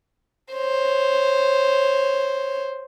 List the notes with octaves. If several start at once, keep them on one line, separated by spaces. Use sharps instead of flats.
C5 C#5